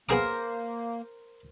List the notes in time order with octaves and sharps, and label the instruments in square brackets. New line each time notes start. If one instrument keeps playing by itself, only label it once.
[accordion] A#3 [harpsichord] B3 G#4 D6 [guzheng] A#4 C5